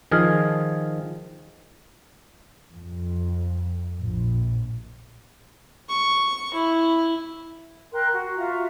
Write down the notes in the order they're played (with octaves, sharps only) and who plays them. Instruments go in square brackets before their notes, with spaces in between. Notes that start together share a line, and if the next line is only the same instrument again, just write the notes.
[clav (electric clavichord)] D#3 F3 G#4 F5
[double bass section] F2
A#1
[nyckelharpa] C#6
E4
[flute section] A#4 G5 C6 F#6
F#4
F4 F#4 E5 A#5